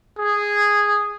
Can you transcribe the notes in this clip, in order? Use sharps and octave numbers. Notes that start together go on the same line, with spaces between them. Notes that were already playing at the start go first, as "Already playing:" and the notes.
G#4